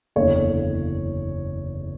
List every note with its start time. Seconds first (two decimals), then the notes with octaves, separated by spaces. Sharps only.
0.16 F#1 E2 D3 C#5